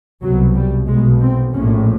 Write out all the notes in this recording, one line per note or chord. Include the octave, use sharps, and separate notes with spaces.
C2 B2 F#3
G3
B1 B2 G#3
C4
A#1 A2 C#4